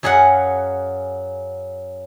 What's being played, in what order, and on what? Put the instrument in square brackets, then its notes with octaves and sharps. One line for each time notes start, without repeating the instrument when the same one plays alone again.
[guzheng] F#2 F#3 G#4 F5 F#5